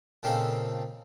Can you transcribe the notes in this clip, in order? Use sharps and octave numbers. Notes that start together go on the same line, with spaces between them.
A#2 C#3 C4 D4 D#4 A4